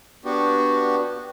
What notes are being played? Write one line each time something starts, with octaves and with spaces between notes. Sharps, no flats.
B3 D4 F#4 G4